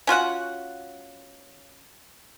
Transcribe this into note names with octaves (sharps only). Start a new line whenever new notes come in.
C#4 F4 F#4 F#5